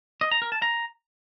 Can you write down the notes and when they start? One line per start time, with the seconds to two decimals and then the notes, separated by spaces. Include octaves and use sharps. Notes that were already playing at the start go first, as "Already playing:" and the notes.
0.21 D#5
0.31 A#5
0.42 A#4
0.52 A5
0.62 A#5